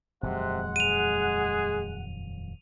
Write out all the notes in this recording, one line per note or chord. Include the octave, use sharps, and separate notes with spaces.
D#1 F2 C3 F#3 G#3 F#5
G#4 D#7 F7